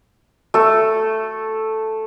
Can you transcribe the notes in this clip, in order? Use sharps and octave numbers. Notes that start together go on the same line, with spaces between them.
A3 A4